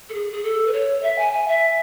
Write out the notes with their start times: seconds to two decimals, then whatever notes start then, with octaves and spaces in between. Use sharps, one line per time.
0.09 A4
0.13 G#4
0.31 G#4
0.43 A4
0.67 B4
0.72 C#5
1.02 E5
1.18 G#5
1.33 G#5
1.47 E5